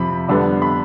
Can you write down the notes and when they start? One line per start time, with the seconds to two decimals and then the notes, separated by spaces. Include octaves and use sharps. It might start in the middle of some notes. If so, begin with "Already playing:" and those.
Already playing: F2 C3 F3 B5
0.28 F2 D3 G3 B3
0.62 B5